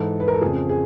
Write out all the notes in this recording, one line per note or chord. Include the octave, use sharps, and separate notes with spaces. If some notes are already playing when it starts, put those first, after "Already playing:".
Already playing: G#2 E3 A4
B4
A#4
A4
F2 C#3 F3 G#4
G#4